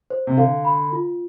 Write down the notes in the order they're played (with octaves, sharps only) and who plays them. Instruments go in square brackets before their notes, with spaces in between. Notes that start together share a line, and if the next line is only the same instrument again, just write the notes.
[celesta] C5
[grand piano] C3
[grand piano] D3 [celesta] F5
[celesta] B5
F4